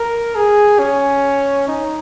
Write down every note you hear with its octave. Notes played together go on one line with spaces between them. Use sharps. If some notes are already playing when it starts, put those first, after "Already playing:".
Already playing: A#4
G#4
C#4
D#4